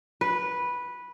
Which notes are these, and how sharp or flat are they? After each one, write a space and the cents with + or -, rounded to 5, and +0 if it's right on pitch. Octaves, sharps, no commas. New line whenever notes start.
B4 -10